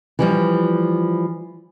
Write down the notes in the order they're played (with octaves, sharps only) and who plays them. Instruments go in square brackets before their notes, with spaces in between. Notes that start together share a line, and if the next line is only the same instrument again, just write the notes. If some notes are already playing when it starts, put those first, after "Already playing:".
[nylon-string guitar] E3 F3 G3